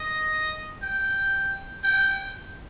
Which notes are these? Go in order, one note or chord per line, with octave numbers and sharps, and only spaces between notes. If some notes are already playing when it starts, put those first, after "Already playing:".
Already playing: D#5
G5
G5